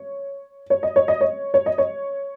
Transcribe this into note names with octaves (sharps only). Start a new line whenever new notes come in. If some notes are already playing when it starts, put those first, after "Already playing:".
Already playing: C#5
C#5
D#5
C#5
D#5
C#5
C#5
D#5
C#5